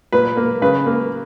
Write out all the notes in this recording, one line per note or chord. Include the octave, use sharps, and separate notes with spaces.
A#2 B4
A#3
C#3 B4
A#3